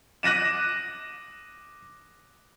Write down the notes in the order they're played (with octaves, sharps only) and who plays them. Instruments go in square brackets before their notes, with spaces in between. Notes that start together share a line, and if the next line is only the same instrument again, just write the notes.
[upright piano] D6 F#6 A#6 D#7 E7